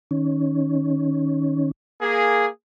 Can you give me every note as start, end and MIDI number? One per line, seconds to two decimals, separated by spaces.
0.11 1.71 51
0.11 1.71 61
2.02 2.48 58
2.02 2.48 68